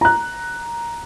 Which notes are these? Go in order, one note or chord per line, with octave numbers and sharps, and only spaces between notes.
A#5 F#6